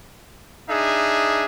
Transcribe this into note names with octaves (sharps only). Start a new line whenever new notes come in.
D4 D#4 G#4 E5